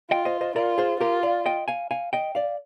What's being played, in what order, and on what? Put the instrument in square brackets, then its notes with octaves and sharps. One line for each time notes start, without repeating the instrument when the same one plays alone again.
[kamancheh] F4 [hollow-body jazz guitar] D#5 G5
[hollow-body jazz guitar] C5 D#5
C5 D#5
[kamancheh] F4 [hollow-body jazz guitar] A#4 D5
[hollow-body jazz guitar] G#4 C5
[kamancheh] F4 [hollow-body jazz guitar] G4 A#4
[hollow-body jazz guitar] D5 F5
D#5 G5
F5 G#5
F5 G#5
D#5 G5
D5 F5